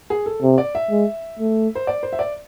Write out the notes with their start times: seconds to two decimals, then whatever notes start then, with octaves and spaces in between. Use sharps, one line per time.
0.10 G#4
0.26 A4
0.42 C3
0.58 D5
0.75 E5
0.90 G#3
1.39 A3
1.75 C5
1.87 D5
2.03 C5
2.13 E5
2.19 D5